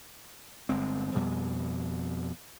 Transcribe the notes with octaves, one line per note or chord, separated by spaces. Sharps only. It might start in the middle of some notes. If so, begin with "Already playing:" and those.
G1 G#3 C4
F2 B2 G3